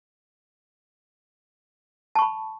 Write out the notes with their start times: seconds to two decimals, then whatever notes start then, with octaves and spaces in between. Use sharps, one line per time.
2.15 A5
2.19 C#6
2.22 B5